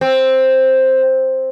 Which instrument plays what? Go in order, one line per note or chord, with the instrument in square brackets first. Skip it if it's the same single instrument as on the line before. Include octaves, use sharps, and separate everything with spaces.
[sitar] C4